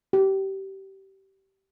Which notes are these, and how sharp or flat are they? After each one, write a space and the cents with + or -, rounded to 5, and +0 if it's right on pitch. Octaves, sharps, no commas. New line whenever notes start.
G4 -20